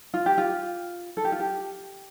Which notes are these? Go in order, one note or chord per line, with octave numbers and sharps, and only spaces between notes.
F4
G4
F4
A4
G4
F4
G4